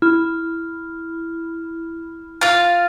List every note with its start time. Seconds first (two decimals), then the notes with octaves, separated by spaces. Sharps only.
0.02 E4 F6
2.41 F4 F5 F6 A6